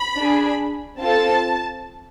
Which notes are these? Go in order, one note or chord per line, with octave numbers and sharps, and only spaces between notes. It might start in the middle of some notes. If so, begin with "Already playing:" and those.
Already playing: B5
D4 G#4
C4 F4 A4 A5